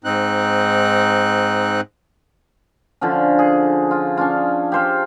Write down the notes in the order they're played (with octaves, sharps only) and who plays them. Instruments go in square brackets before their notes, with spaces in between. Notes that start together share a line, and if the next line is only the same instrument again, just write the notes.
[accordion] G#2 C4 D#4 F#6
[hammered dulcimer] D3 F3 C#4
G#4
F4
C#4 D4 F4
G4 C5 F5